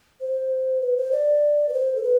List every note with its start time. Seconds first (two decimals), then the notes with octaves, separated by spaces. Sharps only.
0.21 C5
0.81 B4
0.97 C5
1.12 D5
1.69 B4
1.73 C5
1.96 A4
2.03 B4